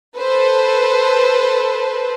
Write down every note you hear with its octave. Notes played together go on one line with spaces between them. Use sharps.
A4 B4 C5